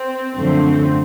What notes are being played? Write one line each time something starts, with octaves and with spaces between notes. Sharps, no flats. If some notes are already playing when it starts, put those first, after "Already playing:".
Already playing: C4
F#2 D3 F3 A3 C4